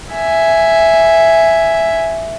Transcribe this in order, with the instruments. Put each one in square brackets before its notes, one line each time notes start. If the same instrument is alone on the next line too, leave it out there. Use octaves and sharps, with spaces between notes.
[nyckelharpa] E5 G#5